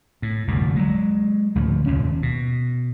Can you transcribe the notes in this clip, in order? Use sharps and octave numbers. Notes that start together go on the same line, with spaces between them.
A2
F1 D2 G2 A#2
F#3 G#3
D2 A2 F3
F1 D#2 A#2 C#4
B2